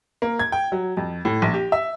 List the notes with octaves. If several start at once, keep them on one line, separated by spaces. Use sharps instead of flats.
A#3
G#6
G5
F#3
F2
A2
A#1
G4
E5